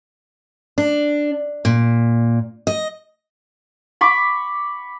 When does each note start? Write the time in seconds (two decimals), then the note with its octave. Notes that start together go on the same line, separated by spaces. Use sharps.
0.78 D4
1.65 A#2
2.67 D#5
4.01 B5 C#6 D6